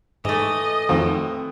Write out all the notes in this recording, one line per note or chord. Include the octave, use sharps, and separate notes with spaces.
G#2 E3 A3 D#5
F2 A2 D#3 F3 C4 F#4